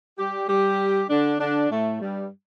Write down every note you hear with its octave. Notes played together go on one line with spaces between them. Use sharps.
G3 G4
G3 G4
D3 D4
D3 D4
A2 A3
G2 G3